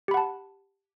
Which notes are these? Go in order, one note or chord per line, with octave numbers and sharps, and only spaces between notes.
G4 F#5 A5 B5